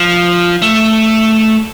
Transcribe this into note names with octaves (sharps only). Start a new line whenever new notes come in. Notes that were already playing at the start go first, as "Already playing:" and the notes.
Already playing: F3
A3